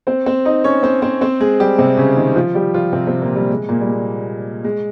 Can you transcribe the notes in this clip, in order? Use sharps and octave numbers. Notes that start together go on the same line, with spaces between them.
C4 C5
C4 C5
D#4 D#5
C#4 C#5
C4 C5
C4 C5
C4 C5
G#3 G#4
G3 G4
C3 C4
C#3 C#4
D#3 D#4
F3 F4
G3 G4
F3 F4
C3 C4
C3 C4
A#2 A#3
G3
G#3
A#2 A#3
G3
G#3
G#3